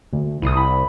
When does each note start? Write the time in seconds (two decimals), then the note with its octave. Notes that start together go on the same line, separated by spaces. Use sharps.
0.13 D2
0.42 C2 E4 D#6
0.57 B5